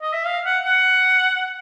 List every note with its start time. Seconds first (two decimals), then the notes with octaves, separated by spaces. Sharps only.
0.02 D#5
0.13 E5
0.25 F5
0.46 F#5
0.66 F#5